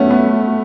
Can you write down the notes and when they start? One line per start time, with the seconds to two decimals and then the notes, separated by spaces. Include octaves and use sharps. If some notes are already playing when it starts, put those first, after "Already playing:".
Already playing: A3 B3 C#4
0.11 B3